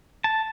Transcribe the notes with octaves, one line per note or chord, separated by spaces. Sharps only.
A5